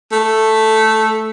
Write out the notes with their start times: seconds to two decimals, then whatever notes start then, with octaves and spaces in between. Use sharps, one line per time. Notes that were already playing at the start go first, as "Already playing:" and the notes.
0.12 A3